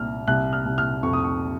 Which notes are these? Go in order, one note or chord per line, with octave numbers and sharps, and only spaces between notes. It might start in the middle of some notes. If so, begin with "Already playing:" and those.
Already playing: C2 A#2 F6
C2 F#6
F6
C2
F6
F2 C#6
D#6
C#6